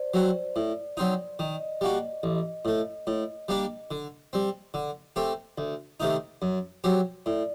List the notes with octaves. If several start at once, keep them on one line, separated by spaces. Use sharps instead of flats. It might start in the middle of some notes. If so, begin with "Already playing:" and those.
Already playing: C5 D5
F#3 C4 F#4
A2
F#3 C4 D#4
D#3 D#5
G3 A#3 F#4
A1
A2 A3
A2
G3 A#3 D4 G4
D3
G3 C4
D3
A3 C4 G4
D2
C3 D#3 A3 D#4
F#2
F#3 C4 G4
A2 D5